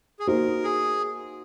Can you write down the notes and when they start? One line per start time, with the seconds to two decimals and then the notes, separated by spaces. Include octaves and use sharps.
0.19 G#4
0.27 A#3 D#4 F#4 A#4 C5
0.64 G#4